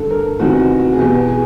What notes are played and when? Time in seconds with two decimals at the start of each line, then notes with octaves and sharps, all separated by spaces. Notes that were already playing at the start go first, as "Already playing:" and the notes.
Already playing: G2 D3 A4
0.10 A#4
0.39 E2 C3 D#3 F#4
0.60 F#4
0.80 F#4
0.93 G#4
0.99 E2 B2 G4
1.28 G#4